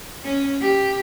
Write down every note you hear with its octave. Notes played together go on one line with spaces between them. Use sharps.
C#4
G4